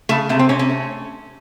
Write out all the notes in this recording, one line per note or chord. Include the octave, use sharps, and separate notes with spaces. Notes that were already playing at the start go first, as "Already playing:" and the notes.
C#3 A3
C3 A3
C4
C3 C#4
C#4
A3